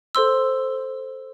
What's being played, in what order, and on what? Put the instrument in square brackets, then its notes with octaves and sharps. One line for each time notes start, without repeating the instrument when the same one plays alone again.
[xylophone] A4 C5 C6 E6